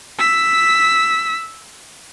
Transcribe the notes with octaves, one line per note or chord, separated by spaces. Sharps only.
E6 B6